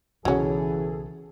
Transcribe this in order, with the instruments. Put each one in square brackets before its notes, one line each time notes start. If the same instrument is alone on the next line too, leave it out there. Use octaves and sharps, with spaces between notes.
[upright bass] B1 C#3 [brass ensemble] E3 [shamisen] F#3 C#4 [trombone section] G#4 A4